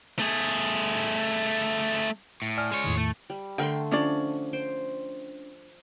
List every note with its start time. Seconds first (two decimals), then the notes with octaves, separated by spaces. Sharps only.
0.19 A3 G#4
2.42 A2
2.57 D5 G#5 F6
2.71 G#3 C#5
2.84 E2 A2 D#3
2.97 A3
3.30 G3
3.58 D3 A3 A#4 G5 C6
3.91 F3 C#4 D4 D5
4.53 C5 G5